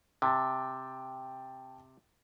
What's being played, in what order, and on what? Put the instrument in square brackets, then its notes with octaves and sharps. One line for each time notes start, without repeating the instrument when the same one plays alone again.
[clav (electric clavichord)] C3 [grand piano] G5 A5 A6